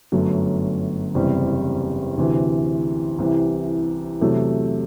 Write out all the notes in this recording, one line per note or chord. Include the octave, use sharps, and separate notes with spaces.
G1 F#2 F#3 A3
F#1 E2 C3 G3 C4
D2 C3 E3
C2 C3 E3
E2 C3 F#3 A3